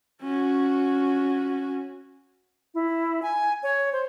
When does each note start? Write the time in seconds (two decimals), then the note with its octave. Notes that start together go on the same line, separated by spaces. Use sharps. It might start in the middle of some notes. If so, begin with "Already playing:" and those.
0.22 C#4 F#4
2.74 E4
3.22 G#5
3.63 C#5
3.93 C5